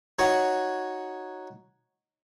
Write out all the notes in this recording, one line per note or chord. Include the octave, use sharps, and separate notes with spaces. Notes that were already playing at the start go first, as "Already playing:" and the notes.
D#4 F#4 C#5 F#5